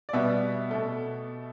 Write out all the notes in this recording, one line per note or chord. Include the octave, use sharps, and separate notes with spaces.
D5
B2 G3 B3 E5
B2 A3